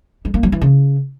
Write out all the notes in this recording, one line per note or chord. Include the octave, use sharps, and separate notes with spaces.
G#3
A#3
F#3
E3
C#3